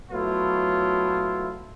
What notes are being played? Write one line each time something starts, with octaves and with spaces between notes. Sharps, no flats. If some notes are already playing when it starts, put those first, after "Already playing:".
F#3 A3 B3 E4 F4